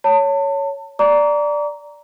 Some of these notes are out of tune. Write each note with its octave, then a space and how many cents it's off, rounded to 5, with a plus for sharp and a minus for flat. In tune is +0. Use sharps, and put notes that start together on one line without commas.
C#5 +5 A5 +30
D5 +0 A#5 +0 D6 -40